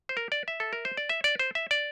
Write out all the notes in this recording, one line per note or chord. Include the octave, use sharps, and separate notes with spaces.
C5
A#4
D5
E5
A4
A#4
C5
D5
E5
D5
C5
E5
D5